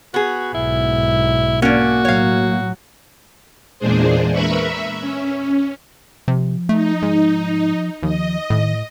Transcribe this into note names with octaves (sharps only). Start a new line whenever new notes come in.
B3 F#4 G#4
B1 G#2 E4
A#3 C#4 D4 F#4
A2 F#3 C#5 F5
E2 A#2 G#3 D4 G#4 C5
A#4 B4 E5 B5 C#6
E5
C#4
C3 F3
A3 D#4
G#2
D#2 F3 D#5
A2 D#3